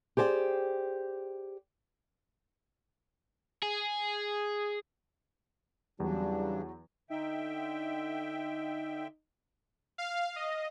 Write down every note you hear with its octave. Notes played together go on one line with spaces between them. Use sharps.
G4 G#4 C5 D5 G5
G#4
E2 C#3 E3 F#3 G3 D4
D3 D#4 E5 G5
F5
D#5